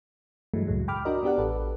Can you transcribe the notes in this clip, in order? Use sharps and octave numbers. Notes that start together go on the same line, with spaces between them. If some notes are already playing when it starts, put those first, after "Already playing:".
G2 E3 F#3 G#3 A3
C#2 F#2 A2 F#3 G#3
G5 B5 D6 F6
D4 F#4 A#4 D#5
B3 D4 G4 D5 F#5
A1 A4 B4